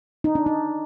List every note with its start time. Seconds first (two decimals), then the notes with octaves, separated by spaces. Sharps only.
0.24 D#4
0.35 D4
0.46 D#4